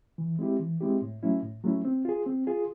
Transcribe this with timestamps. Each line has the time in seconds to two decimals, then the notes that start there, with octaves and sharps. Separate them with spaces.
0.18 E3
0.39 G#3 C4 E4 G4
0.60 E3
0.80 G#3 C4 E4 G4
1.02 A2
1.23 F#3 A3 C#4 E4
1.43 A2
1.64 F#3 A3 C#4 E4
1.85 C4
2.05 F4 G#4
2.26 C4
2.47 F4 G#4